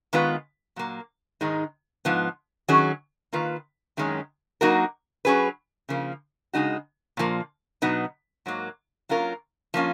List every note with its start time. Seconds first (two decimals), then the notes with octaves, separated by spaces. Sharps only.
0.13 D#3 G#3 B3 F4 B4
0.76 A#2 F#3 A#3
1.41 G#2 D#3 G#3 D#4
2.05 G#2 F3 B3
2.68 D#3 F#3 C#4 G#4
3.33 D#3 A#3 F4 B4
3.97 F#2 D#3 G#3 C#4
4.61 F#3 A#3 D#4 F#4 A#4
5.25 F#3 C#4 G#4 B4
5.89 C#3 F3 A#3
6.53 C#3 G#3 D#4 F#4
7.17 A#2 F3 A#3
7.82 B2 F#3 B3 D#4
8.46 G#2 F#3 A#3
9.09 F#3 A#3 C#4 F4 A#4
9.74 F3 A#3 C#4 F4